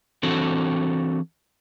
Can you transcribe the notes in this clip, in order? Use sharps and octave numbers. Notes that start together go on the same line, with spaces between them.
E3 C4 D4 F#4 A4